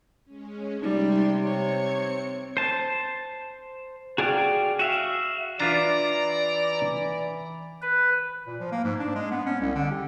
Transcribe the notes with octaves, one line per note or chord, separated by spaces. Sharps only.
G#3 C#4
C3 G3 D#4 G5 C6
C4 C#5 C#7
C5 A5
F#4 G#4 D5 F5 G5
F#4 E5 F5
E3 D4 F4 D5 E5 A#5
B4
A#2
F3
A#3
G#2
D4
G#3
B3
C#4
C2
D3
G4